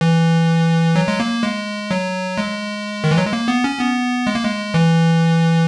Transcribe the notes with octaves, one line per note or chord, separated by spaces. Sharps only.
E3
F#3
G#3
A#3
G#3
F#3
G#3
D#3
E3
F#3
G#3
A#3
B3
C#4
B3
G#3
A#3
G#3
E3